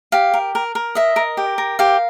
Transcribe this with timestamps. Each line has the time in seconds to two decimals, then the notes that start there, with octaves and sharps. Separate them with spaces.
0.12 G4 F5
0.34 A#4
0.55 A#4
0.75 A#4
0.95 D#5 E5
1.16 A#4
1.37 G4
1.58 A#4
1.79 G4 F5